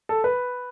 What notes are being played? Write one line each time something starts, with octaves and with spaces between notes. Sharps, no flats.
A4
B4